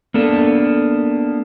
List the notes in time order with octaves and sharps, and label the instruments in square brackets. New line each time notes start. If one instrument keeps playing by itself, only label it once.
[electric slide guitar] A#3 B3 D4 A4